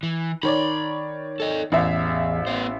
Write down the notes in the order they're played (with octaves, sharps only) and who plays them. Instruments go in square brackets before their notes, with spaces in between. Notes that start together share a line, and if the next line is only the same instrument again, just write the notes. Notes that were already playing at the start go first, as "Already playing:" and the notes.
[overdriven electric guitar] E3
[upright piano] D#3 C#5 D5 [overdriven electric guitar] A#5 B5
[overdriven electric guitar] A4 D#5
[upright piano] A1 E5 F5 [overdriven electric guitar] E2
[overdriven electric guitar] B3 C5